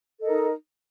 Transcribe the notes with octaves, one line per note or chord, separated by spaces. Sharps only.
D#4 A4 A#4 D#5